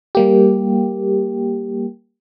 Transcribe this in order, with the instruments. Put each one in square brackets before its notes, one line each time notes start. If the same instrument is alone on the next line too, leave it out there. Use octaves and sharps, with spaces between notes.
[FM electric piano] G3 A#3 G4